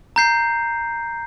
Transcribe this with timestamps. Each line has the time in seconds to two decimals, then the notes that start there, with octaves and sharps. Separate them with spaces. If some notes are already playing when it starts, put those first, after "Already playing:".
0.16 A#5 G6 C7